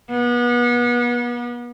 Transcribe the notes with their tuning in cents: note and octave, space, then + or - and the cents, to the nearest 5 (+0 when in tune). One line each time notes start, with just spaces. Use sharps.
B3 -35